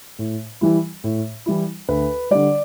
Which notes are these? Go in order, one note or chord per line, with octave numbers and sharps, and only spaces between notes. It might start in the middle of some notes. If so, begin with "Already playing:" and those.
A2
E3 G3 E4
A2
E3 G3 E4
D2 B4
D3 G3 D5